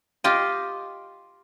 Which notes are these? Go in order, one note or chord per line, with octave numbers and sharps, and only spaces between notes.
F4 G4 D#5